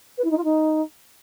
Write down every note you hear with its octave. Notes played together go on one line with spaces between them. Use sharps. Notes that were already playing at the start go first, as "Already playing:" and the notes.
B4
E4
D#4
F4
D#4